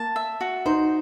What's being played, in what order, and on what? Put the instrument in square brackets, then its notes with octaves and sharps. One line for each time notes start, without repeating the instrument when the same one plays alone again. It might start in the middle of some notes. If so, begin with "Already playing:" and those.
Already playing: [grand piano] A#3 [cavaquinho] A5
[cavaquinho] E5
F#4
[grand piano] D#4 [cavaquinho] C5